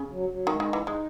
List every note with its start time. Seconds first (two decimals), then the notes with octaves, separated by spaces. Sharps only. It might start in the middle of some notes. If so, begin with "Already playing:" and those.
Already playing: C#3
0.11 F#3
0.29 F#3
0.47 D#3 G#3
0.60 D#3 D#4
0.73 E3
0.83 G#3 D#4